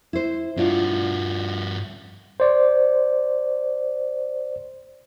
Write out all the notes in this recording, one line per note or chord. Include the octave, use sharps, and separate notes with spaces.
E4 C5
G2 D4 F4 F#4
C5 D5